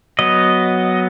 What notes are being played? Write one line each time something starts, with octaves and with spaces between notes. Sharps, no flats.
F#3 B3 D#5